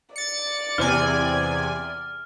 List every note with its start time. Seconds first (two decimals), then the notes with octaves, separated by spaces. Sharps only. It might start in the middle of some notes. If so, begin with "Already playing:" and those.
0.16 D5 A6 C#7
0.78 E2 C3 G#5 F6